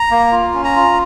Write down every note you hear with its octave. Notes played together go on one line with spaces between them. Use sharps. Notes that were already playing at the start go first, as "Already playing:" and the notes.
Already playing: A#5
A#3
F4
C#4
A#5
F4